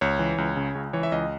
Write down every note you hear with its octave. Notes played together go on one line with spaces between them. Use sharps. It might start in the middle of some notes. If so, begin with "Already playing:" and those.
C#2 C#5
E3
C#2
C#3
C#2
E3 C#5
E5
C#2 D#5